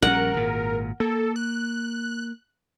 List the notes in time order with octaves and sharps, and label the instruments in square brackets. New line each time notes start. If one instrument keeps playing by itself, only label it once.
[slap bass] A#1 G3 C#4 [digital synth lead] A#4 [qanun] F#5
[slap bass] G#1 A#2
[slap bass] A#3 [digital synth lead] A4
[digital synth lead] F#6